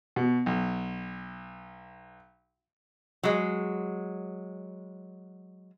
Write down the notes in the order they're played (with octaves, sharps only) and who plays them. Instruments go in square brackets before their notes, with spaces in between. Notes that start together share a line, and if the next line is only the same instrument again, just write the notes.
[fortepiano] B2
B1
[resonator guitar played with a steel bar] F#3 G#3